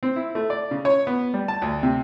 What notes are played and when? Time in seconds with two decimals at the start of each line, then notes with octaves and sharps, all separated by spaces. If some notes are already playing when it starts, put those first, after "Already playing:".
0.03 C4
0.16 E4
0.35 A3
0.50 D5
0.71 C#3
0.85 C#5
1.07 B3
1.34 G3
1.48 A5
1.62 D2
1.83 C3